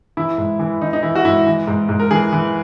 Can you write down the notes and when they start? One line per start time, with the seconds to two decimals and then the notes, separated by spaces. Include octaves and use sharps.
0.17 E3 E4
0.38 G#2
0.59 E3
0.82 E3 D#4
0.93 D#4
1.03 E3 E4
1.15 F#4
1.25 G#2 E4
1.47 E3
1.67 G#2
1.89 G#2
2.00 A#4
2.11 E3 G#4
2.33 E3